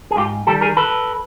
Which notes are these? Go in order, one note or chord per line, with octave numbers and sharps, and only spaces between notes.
G#4
G#2 F4 G4
D#3 G3 G4 A4
G#4 A#4
A4 B4